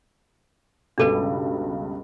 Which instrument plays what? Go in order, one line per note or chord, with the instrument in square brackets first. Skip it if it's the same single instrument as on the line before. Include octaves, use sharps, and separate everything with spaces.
[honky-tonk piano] C#2 G2 B2 [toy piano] D4 A4 B4